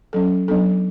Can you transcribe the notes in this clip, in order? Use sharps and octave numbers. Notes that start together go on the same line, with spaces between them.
F#3 C#4 A4
F#3 B3 D4 A4